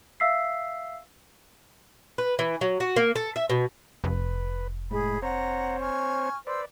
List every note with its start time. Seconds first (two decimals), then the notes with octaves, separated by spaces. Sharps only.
0.20 E5 F5 E6 B6 C7
2.18 B4
2.39 E3
2.61 F#3
2.80 F#4
2.96 A#3
3.16 A4
3.36 E5
3.50 B2
4.04 F1 B4
4.91 A2 G#3 G#4 B5
5.22 C4 C5 C#5 F#5 A#5
5.80 G#5 C#6 F6
6.47 B4 C5 D5 E6